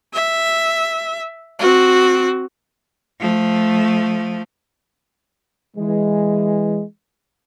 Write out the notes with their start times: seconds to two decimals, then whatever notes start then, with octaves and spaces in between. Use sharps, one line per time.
0.13 E5
1.59 C4 F#4
3.20 F3 A3
5.76 E3 G#3